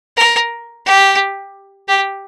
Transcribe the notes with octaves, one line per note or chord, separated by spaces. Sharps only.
A#4
G4
G4